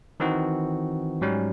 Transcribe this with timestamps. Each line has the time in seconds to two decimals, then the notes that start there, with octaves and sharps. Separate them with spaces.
0.20 D#3 E3 C4 D#4 F#4
1.21 G#2 F#3 G3 C#4